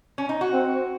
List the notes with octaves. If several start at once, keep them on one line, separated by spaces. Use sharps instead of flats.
C#4
D#4
F#4
C4